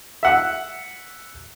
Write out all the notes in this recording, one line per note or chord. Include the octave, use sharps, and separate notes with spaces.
E5 F#5